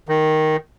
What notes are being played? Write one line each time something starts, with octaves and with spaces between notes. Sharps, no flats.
D#3